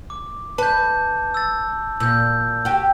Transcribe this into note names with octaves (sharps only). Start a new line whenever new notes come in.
D6
B4 A5 G6
E6 A6
A#2 E6 G6
F#4 G4